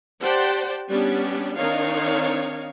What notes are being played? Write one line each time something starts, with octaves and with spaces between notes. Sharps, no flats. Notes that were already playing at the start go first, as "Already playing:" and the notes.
G4 C5 D5 F#5 G5 A5
G3 B3 C#4 D4 G4
D#3 C4 D4 D#4 C#5 F5